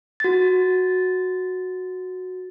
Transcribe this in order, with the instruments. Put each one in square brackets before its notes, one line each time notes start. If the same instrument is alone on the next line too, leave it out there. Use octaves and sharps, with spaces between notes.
[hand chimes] F#4 A6